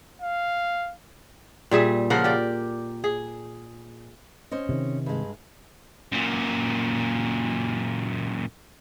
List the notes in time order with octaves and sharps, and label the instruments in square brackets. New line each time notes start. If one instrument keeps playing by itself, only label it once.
[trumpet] F5
[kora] A#2 G3 G#4 E5
C#3 F3 A#4 F#5
G4 D5
G#4
[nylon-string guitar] C#4 C5 D#5
[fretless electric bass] C3 D#3
[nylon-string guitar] G2 G#3
[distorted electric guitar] F#2 A#2